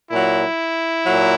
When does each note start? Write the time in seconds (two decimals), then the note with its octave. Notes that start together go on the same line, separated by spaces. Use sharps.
0.10 A#2 F#3 E4
1.04 A#2 F#3